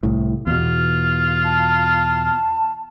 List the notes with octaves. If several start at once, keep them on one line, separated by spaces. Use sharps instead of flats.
C2 A2
E2 B2 F4
A5